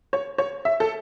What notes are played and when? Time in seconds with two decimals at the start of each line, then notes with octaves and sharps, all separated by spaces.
0.13 C#5
0.38 C#5
0.65 E5
0.80 A4